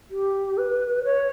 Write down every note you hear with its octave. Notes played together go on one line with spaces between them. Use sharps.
G4
B4
C#5